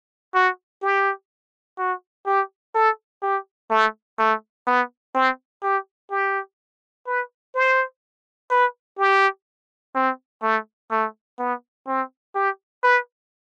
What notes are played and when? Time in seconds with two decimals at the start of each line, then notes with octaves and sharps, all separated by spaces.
0.35 F#4
0.83 G4
1.78 F#4
2.26 G4
2.75 A4
3.23 G4
3.71 A3
4.19 A3
4.67 B3
5.15 C4
5.63 G4
6.11 G4
7.07 B4
7.55 C5
8.51 B4
8.99 G4
9.95 C4
10.43 A3
10.91 A3
11.39 B3
11.87 C4
12.35 G4
12.84 B4